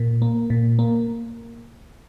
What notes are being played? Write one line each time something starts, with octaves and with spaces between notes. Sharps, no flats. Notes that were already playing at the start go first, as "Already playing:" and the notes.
Already playing: A#2
A#3
A#2
A#3